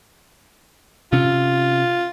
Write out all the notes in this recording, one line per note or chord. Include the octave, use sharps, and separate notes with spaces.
C3 C#4 F4